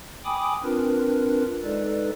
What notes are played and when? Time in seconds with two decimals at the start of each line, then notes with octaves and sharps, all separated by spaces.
0.25 G5 G#5 B5 D6 D#6
0.63 C4 D4 F4 A#4 B4
1.64 G#3 D#4 A4 B4 D5